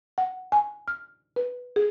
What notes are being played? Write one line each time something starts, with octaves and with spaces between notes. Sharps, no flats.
F#5
G#5
F6
B4
G#4